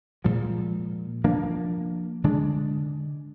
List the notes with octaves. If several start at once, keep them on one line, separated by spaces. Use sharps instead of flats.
A#2 F3 G#3
F3 A#3 D4
D3 G#3 D4